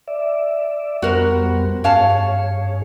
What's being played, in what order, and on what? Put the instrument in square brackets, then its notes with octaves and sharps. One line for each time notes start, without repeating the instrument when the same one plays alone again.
[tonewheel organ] D5 E5
[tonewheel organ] F2 G3 B3 [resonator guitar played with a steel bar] F#4 A#4 C5
[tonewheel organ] G2 G#4 C#5 [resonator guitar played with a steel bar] C#4 F5 A5